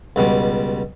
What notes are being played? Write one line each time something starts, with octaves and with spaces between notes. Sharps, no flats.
C#2 B2 G3